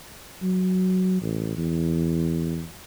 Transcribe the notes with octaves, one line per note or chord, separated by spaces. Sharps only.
F#3
A1
E2